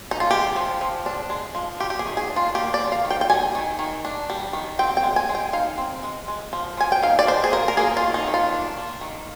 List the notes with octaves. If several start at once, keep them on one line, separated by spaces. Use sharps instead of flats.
D#4
F4
G#3 G4
F3
F3
D4
G#3
F3
G3 G4
G4
G#4
D#3
G#4
D4
F4
A#3 G4
D5
G3
F5
D#3
G5
G5
G3 G#5
D#3
D#3
D4
G3
D#3
C4 G5
G5
G#3
G#5
G#3
G5
D#4 F5
C4
G#3
G#3
F3
F3 G#5
G5
D#4 F5
D5
G#3 C5
G#4
F3 A#4
A#4
A#3 G#4
F4
D#3
D#4
D#3
F4
D4
A#3
D#3